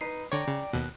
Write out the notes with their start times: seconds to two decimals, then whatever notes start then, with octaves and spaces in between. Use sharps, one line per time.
0.01 D#4 B4 C7
0.32 D3 C#5 D5 G5 A#5
0.48 C#3
0.73 D#2 B2 F#6